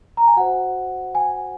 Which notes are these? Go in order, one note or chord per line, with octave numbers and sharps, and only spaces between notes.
A#5
G#5
F#4 C5 F#5
G#5